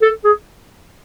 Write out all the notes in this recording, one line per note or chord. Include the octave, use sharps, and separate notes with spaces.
A4
G#4